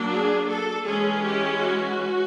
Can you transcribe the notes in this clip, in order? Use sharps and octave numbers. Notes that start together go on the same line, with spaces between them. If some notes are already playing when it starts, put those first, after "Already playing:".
Already playing: F#3 A#3 D4
G#4
A4
E3 G#3 C#4 G#4
G4
F#4